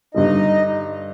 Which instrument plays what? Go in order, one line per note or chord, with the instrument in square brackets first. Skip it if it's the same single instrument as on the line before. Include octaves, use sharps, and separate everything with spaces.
[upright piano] G2 D3 G3 [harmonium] D#4 D#5